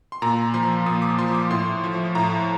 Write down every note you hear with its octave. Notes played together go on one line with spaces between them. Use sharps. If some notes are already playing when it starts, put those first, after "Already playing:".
C6
A#2 A#5
F3 C6
A#2 D#6
D6
F3 C6
D6
A2 C6
F3
A2 A#5